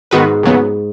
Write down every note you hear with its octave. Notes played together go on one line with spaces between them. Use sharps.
G#2 D#3 B3 F#4 B4
D#2 C#3 F#3 B3